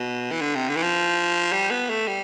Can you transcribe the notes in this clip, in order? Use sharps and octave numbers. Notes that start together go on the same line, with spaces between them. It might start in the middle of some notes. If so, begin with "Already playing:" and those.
Already playing: B2
E3
D3
C3
D3
E3
F3
G3
B3
A3
G3